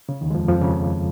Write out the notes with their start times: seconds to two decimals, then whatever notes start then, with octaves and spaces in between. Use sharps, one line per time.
0.09 C#3
0.21 D#2 D#3
0.31 G#3
0.34 F2 F3
0.48 F2 F3
0.61 C#3